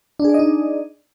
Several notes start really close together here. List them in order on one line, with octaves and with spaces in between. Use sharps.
D4 G#4 D5 D#5 D#4